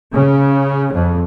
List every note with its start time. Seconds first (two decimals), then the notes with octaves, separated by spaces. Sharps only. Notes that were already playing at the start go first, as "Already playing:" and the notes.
0.14 C#3
0.93 F2